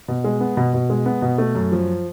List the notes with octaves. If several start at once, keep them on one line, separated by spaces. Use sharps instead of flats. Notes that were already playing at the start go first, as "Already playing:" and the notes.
B2
G#3
B3
B2
B2
G#3
B3
B2
A3
F#2
F3